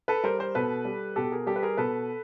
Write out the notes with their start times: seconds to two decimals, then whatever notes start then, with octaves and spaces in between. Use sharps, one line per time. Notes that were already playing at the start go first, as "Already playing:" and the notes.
0.08 A4 B4
0.23 G3 A#4 C5
0.39 A#4 C5
0.55 B2 A4 B4
0.85 G3
1.16 B2 G4 A4
1.32 G#4 A#4
1.47 G3 G4 A4
1.56 B4
1.62 G#4 A#4
1.77 B2 A4 B4